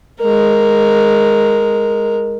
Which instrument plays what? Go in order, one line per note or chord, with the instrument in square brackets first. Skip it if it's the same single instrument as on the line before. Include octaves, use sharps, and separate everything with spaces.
[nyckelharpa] G#3 A#4